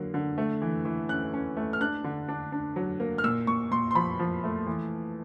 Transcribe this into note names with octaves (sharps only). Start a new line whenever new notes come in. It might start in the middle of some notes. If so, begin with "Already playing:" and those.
Already playing: D3 F#3 A#3
D3
A3
E3
E3
C#4 F#6
C#4
A3
F6
D4 F#6
D3
D4
D4
F#3
A#3
F6
A#2 E6
A#2 C#6
A#2 C6
C6
F3 B5
F3
A3
E3